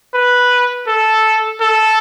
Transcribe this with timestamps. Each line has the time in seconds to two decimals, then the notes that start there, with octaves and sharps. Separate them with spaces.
0.14 B4
0.88 A4
1.61 A4